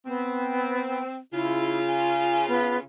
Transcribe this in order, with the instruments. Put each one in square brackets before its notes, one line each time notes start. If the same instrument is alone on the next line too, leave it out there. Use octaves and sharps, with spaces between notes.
[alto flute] B3 [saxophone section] C4
[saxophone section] C#3 F4 [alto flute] E4
[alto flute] G#5
B3